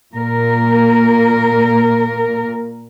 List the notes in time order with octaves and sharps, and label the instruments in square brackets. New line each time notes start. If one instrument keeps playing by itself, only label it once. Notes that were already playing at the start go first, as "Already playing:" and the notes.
[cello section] A#2 A#4